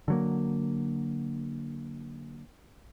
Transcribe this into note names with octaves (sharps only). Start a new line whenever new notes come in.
D3 F#3 A#3